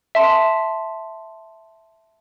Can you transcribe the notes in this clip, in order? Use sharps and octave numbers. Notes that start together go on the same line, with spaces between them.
E5 A5 C6